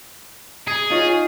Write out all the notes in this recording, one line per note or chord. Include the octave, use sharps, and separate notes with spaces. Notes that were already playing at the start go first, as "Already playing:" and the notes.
G#4
D#4 F4 C#5